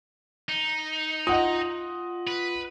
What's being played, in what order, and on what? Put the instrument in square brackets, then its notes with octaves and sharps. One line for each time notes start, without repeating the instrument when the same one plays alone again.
[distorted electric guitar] D#4
[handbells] F4 [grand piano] D#5 F#5 D#6
[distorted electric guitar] B4